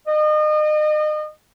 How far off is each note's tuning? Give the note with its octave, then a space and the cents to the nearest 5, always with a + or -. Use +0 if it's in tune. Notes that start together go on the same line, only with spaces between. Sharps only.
D#5 -35